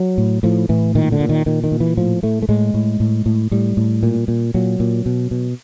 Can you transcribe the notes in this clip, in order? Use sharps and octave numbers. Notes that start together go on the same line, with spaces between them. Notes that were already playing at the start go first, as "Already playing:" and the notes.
Already playing: F#3
A2
A2 F3
A2 E3
A#2 D#3
D3
A#2
D#3
A#2 D#3
D#3
A#2
E3
A2 F3
A2 A3
A3
A2 G#3
A2
A2
A2
A2 G3
A2
A#2
A#2
A#2 F#3
A#2
B2
B2